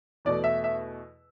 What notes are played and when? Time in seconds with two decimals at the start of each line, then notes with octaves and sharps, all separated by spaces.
0.25 E2 B2 A3 D5
0.44 E5
0.64 E5